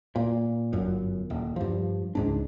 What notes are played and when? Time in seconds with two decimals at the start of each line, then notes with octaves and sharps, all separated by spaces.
0.16 A#2
0.73 G1 F#2
1.30 D#1
1.56 G2 F3
2.15 C#2 G#2 D4